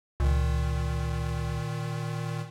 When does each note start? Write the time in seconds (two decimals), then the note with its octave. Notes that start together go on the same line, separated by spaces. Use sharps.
0.20 C#2 A#2 D#3